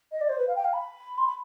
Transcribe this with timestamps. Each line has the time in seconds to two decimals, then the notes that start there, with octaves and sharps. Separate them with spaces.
0.12 D#5
0.21 D5
0.29 C5
0.38 B4
0.48 F5
0.56 G5
0.65 F5
0.73 B5
1.18 C6
1.27 B5